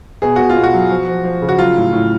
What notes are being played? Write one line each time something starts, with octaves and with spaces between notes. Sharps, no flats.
B2 G#4
B2 F#4
F4
B2
F#4
F#3
F3
F3
F3
C#3
F#4
F#3 F4
A2
A2